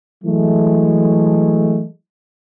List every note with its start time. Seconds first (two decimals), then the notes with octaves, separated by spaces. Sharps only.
0.24 E3 F#3 G#3 A3